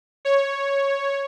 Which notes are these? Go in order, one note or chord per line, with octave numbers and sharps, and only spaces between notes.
C#5